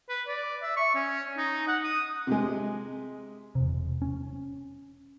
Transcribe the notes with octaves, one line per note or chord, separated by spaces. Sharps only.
B4
D5
E5
C#6
C#4
D#4
F#5
D#6
C3 G#3
E1 C3
C#4